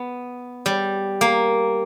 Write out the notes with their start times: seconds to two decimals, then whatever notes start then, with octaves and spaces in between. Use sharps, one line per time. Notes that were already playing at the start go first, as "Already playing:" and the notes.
Already playing: B3
0.66 G3
1.21 A#3